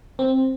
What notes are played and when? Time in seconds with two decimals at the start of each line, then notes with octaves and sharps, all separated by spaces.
0.19 C4